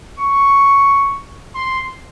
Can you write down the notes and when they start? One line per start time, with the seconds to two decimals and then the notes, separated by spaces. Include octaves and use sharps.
0.19 C#6
1.55 C6